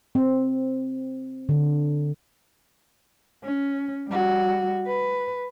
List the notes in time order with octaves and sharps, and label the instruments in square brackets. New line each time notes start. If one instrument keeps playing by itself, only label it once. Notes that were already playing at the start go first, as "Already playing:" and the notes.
[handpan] C4
D3
[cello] C#4
G3 F#4
B4